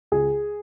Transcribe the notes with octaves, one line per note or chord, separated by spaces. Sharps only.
C#2 G#4